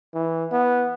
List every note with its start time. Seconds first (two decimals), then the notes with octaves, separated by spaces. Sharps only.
0.14 E3
0.52 B3